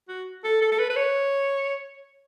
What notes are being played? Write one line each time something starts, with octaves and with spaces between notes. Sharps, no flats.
F#4
A4
A4
A4
B4
B4
C#5